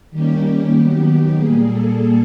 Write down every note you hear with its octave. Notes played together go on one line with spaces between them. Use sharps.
D#3 G3 A#3 C#4 G4
D#3 F#3 B3 G4
G4
A#2 G3 A#3 G#4
A4